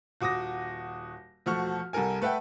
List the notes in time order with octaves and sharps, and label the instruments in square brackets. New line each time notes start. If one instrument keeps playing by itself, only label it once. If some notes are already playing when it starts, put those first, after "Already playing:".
[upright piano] D#1 F#4 D6 D#6 A#6
E1 F3 A3 F#4 C#6 F6
C2 G3 A4 A#4 G#5
A3 B4 E5 F#5 G5